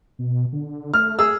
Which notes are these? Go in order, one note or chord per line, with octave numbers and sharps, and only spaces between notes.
B2
D3
A3 F6
G#4 E6